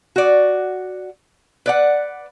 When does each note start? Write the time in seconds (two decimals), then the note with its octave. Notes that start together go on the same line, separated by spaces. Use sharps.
0.16 F#4 D5
1.66 B4 D5 F#5